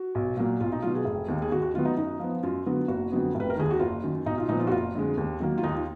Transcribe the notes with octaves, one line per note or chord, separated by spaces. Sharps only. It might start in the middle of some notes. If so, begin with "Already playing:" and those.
Already playing: F#4
B1
A#2 F#3 A#3
B1 F4
D#4
B2 F#3 F4
G#4
F1
D#2 D#3 A#3
G#4
D#2 F#4
F#4
D#3 F#3 B3 F4
D#4
F#2 D#4
F3 B3
F#2 F4
D3 F#3 B3
F#1 F#4
F2 D3 F#3 B3
F1
B4
A#4
D#2 D#3 G#4
F#4
F#1 F4
F#2 D#3
B1 D#4
F4
A#2 F3 B3 D#4
F4
F#4
F#1 F4
F2 D3 G#3
D#2
D#3 F#3 A#3
F4
D#2 D#4
F4